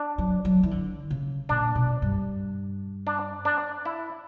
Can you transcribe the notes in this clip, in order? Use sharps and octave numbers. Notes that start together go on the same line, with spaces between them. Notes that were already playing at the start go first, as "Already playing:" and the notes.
Already playing: D4
F#3
F#3
E3
D3
C#3
A#2 D4
B2
G2
D4
D4
E4